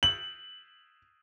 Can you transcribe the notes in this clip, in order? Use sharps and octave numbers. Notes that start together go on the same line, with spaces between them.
F#7